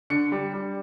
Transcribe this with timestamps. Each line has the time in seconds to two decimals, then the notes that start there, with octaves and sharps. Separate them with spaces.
0.10 D3 C#7
0.32 G3
0.53 G3